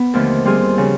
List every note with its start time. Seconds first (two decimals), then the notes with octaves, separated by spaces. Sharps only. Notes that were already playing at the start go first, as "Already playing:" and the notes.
Already playing: B3
0.13 D#2 D3 F3 A3
0.45 G3 C4 F4 G#4
0.77 C#3 F3